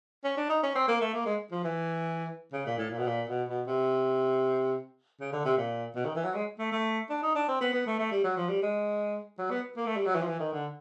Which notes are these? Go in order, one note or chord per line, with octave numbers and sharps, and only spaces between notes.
C#4
D4
D#4
C#4
C4
A#3
A3
A#3
G#3
F3
E3
C#3
A#2
A2
A#2
B2
A#2
B2
B2
C3
C#3
D3
C3
A#2
B2
D#3
E3
F#3
G#3
A3
A3
D4
D#4
D4
C4
B3
B3
A3
A3
G3
F#3
F3
G3
G#3
F#3
B3
A#3
A3
G3
F#3
E3
F3
E3
D#3
D3